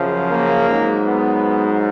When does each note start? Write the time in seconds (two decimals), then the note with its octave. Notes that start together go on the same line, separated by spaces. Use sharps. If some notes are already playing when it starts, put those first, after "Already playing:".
Already playing: F#2 C#3 F3
0.31 A#3
0.68 G#2 F#3
1.06 B3